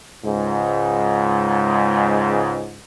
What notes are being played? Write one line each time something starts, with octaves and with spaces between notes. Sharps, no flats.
C#2 G#2